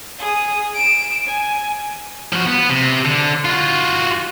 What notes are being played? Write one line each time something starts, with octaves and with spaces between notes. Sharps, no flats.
G#4 D#6
D7 E7
G#5
F3 F#4
B3
C3
D3
F4 F#4